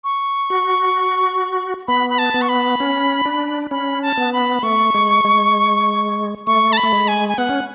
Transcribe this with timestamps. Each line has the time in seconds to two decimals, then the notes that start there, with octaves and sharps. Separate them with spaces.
0.04 C#6
0.50 F#4
1.88 B3 B5
2.10 B5
2.19 A5
2.34 B3
2.42 C#6
2.49 B5
2.80 C#4
3.25 D4
3.71 C#4 B5
4.02 A5
4.17 B3
4.33 B5
4.63 A3 C#6
4.94 G#3
5.25 G#3
6.47 A3 C#6
6.73 A5
6.77 B5
6.83 A3
6.92 G#3
7.08 G#5
7.29 G#5
7.38 B3 F#5
7.49 C#4